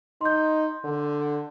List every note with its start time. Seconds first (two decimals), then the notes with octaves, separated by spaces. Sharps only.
0.21 D#4 C6 G6
0.84 D3